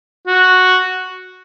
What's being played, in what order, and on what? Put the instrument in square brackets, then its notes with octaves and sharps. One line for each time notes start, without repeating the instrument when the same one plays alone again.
[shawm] F#4